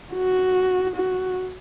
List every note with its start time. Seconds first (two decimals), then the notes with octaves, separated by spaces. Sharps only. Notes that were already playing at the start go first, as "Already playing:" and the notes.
0.14 F#4
0.96 F#4